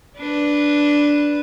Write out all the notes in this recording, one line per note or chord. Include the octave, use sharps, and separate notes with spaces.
D4 B4